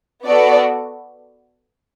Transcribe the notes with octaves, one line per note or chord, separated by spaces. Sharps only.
B3 F#4 A4 D5